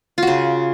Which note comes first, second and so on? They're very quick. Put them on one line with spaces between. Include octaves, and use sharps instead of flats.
F4 F#4 C#3